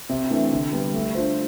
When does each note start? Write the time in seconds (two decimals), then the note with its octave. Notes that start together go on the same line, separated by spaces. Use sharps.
0.09 C3
0.31 E3 A3 D4
0.51 D3
0.73 G3 B3
0.94 A3
1.15 D4 F4 C5